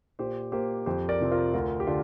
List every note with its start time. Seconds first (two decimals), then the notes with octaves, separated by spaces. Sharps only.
0.19 A#2 G4 C5
0.52 A#3 G4 C5
0.86 F2 G4 C5
1.09 A#4 D5
1.20 C3 F3 C4
1.31 F4 A#4
1.54 D2 F4 A#4
1.80 G4
1.87 D3 F4